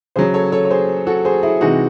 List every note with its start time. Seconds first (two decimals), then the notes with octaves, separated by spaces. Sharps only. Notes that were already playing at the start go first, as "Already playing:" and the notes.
0.16 C#3 F#3 G#4 C5
0.34 A4 C#5
0.52 A4 C#5
0.65 C#5
0.70 G#4 C5
1.07 F#4 A4
1.25 G#4 C5
1.43 E4 G#4
1.61 C3 E3 G#3 D#4 F#4